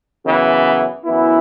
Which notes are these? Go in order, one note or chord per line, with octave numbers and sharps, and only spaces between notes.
F#2 C#3 E3 B3
F#2 E3 B3 E4